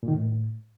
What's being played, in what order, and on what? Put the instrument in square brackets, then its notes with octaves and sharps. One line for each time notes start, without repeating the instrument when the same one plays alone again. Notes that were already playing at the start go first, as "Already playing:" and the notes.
[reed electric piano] A#2
D#3
A2